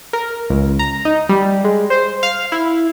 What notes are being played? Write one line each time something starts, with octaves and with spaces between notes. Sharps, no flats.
A#4
C#2
A#5
D#4
G3
G#3
C5
F5
E4